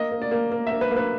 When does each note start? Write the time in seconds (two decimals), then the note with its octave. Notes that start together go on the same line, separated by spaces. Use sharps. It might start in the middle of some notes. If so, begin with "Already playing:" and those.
Already playing: A#3 D#5
0.12 A#3
0.22 D5
0.31 A#3
0.52 A#3
0.67 A#3 E5
0.81 B4
0.91 A#3
0.97 B4